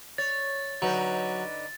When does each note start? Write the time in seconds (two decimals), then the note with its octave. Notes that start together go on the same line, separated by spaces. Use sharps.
0.18 C#5 A6
0.82 D3 F#3 D#4 B4